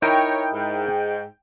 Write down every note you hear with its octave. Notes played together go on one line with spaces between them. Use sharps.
D#4 E4 A#4 C#5 G5
G#2